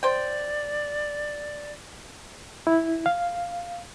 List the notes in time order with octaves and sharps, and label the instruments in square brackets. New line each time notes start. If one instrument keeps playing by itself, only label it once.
[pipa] C5 G5 [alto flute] D5
[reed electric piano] E4
F5